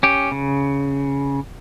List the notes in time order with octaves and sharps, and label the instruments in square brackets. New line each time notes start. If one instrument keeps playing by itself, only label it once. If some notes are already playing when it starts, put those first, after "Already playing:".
[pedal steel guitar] C#4 G4
C#3